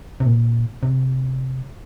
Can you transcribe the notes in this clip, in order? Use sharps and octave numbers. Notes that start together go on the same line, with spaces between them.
C3
A#2
C3